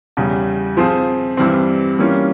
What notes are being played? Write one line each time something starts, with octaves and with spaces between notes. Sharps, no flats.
E2 C#3 G3
F3 C4 F4 G#4 C5
G2 E3 G3 C4
E3 G3 A#3 C#4 F4